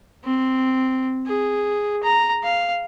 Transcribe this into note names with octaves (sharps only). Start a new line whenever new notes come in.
C4
G#4
A#5
F5